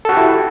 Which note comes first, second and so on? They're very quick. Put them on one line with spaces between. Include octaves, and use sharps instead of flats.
A4 F#4 G4 E4